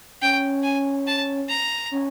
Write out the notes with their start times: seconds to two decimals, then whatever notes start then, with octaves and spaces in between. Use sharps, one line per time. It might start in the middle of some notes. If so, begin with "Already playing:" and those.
0.22 C#4 G5
0.63 G#5
1.07 A5
1.49 A#5
1.91 C#4